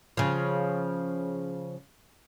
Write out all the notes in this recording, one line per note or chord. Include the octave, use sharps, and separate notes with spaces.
C#3 F3